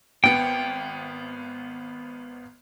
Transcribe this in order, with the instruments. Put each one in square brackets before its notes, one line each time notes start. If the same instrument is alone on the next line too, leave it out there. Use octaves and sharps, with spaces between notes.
[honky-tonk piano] G#1 B3 C#7 [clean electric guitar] G5